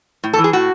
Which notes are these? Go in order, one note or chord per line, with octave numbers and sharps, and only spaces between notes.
A2
A4
E3
G#4
A2 F#4